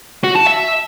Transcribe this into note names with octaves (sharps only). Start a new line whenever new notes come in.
F#4
A5
E5